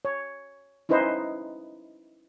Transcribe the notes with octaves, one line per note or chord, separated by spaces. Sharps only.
C#5
C#4 D#4 E4 B4 C5 D#5